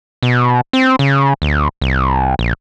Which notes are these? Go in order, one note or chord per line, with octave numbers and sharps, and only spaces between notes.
B2
C4
C#3
D2
C2
A#1